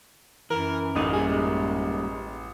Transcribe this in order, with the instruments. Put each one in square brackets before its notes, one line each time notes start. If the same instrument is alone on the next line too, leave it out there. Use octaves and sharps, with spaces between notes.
[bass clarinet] F#2 [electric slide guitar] E3 [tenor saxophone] A#4
[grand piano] A1 [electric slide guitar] E2 A3 F4 [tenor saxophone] D#4
[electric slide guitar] A#2 G3 [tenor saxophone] G#4
[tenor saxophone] G#3